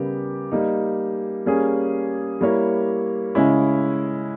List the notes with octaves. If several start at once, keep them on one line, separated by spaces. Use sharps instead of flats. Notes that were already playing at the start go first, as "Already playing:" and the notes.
Already playing: C#3 G3 B3 G4 A#4
G3 A#3 D#4
G3 A#3 C#4 G#4
G3 A#3 E4 A#4 C#5
C#3 G#3 C#4 E4